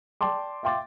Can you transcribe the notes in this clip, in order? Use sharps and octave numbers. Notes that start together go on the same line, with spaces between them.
D5 G5 A5 C6 D6
E5 F5 G5 C6 D6 A6